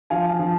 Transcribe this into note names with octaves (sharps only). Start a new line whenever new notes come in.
F3 F5 G#5
F3